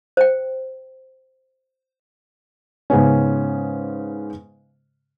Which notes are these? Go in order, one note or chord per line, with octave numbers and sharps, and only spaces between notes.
C5 G5
G#2 C#3 B3 C#4